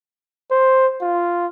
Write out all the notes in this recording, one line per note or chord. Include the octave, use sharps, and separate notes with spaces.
C5
F4